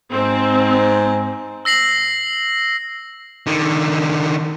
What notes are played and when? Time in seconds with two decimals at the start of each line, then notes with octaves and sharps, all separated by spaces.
0.12 G#2 C4
1.65 E6 A#6 C7 F#7
3.47 D3 D#3